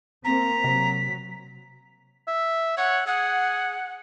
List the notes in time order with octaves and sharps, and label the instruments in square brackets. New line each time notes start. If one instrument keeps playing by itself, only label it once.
[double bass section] A#3 C4 [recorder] A#5 [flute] B6
[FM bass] C3 [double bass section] F#3
[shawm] E5
[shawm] C#5 [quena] F#5
[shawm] G#4 [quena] F#5